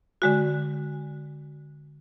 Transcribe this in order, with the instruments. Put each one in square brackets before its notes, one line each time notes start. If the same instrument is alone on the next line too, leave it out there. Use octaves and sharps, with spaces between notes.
[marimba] D3 G#3 F#4